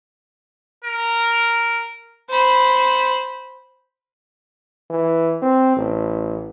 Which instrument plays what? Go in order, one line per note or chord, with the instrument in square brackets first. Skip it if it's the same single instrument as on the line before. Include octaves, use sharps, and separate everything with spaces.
[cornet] A#4
[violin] C5 B5
[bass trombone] E3
C4
A1